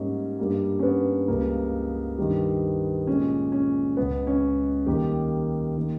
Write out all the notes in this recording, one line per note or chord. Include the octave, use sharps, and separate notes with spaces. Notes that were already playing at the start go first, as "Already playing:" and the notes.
Already playing: G#2 G3 A#3 C#4
G2 G3 A#3
C#4
B3
C#2 C#3 G3 A#3
G2 D#3 G3
A#2 G#3 C#4
C#4
C#2 C#3 G#3 B3
C#4
D#2 D#3 G3 A#3 G4
D#3 A#3